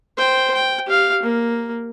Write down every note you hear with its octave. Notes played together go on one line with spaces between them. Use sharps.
C5 G5
G5
G4 F5
A#3